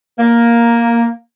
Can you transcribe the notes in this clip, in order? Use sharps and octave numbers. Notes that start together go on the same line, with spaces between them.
A#3